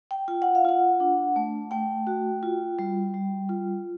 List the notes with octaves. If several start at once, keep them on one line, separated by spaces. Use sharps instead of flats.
G5
F4 G5
F#5
F5
F4 F#5
D4
A3
A3 G5
F#4
F4
G3
G3
F4